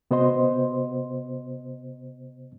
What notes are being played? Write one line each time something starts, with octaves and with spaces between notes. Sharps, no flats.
C3 B3 F#4 C5 D#5 C6